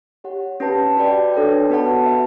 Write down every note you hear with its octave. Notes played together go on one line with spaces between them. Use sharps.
G4 C#5 F#5
C#4 G4 B4 F#5 A5
F#4 B4 D5 G5
D4 A4 C#5 G5
B3 F#4 B4 F#5 A5
F#4 B4 E5